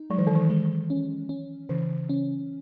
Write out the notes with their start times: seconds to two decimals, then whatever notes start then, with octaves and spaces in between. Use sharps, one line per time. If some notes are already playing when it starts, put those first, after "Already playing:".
Already playing: D#4
0.10 F#3 G#3
0.18 E3
0.27 D#3
0.36 E3
0.50 G#3
0.90 C#4
1.29 C#4
1.69 C#3 E3
2.09 C#4